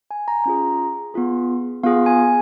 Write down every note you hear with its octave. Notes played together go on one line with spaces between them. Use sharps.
G#5
A#5
C#4 F4 G#4 A#5
B3 F4 G#4
B3 F4 G#4 F5
G#5